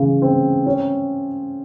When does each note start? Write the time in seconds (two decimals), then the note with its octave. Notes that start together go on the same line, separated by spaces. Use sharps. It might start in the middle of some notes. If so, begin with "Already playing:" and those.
Already playing: C#3 E3
0.22 C4
0.66 C#4